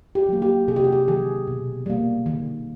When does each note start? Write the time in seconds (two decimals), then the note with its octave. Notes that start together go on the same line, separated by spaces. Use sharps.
0.15 G4
0.29 F#3 A#3
0.42 G4
0.68 C3 G#4
0.76 G4
0.84 F#4
0.92 G4
1.08 D#3 F#3 G#4
1.47 B2
1.86 G3 A#3
2.26 D#3